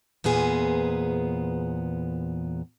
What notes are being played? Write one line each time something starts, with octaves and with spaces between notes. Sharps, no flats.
E2 A#2 B3 G#4 C5